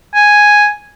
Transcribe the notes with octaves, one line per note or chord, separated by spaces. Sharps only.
G#5